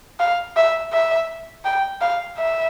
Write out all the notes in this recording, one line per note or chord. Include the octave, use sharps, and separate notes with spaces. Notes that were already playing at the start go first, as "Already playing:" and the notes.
F5
E5
E5
G5
F5
E5